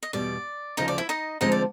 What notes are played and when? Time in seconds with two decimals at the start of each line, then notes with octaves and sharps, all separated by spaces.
0.03 D#5
0.13 E2 B2 G3 D5
0.77 D2 C#3 F3 D#4 D#5
0.88 D5
0.98 E4 E5
1.09 D#4 D#5
1.41 D2 D3 F3 G#3 C4 D#4 D#5
1.52 D5